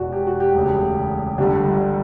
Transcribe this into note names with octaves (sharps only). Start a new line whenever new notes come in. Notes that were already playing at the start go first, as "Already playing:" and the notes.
Already playing: E1 E2 B2 F#4
G4
F#4
G4
E1 D2 C#3
G1 G2 D3 G4